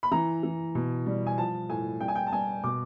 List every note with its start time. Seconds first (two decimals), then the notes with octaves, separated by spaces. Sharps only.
0.03 B5
0.12 E3 A#5
0.43 E3
0.75 B2
1.06 G3
1.26 G#5
1.38 F3 A5
1.69 A2 G#5
2.01 G3 G5
2.08 G#5
2.15 G5
2.27 A5
2.32 G3 G#5
2.64 B2 D6